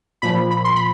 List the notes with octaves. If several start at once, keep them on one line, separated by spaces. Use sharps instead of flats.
A#2 F3 B5
B5
C6
B5